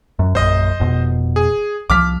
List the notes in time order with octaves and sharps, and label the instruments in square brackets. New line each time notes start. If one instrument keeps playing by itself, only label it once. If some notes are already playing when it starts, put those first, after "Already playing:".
[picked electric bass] F#2
[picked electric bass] A#1 F#2 [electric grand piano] C5 D#5
[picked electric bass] F1 B2
[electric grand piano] G#4
[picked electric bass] C2 F3 [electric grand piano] D6 F6 B6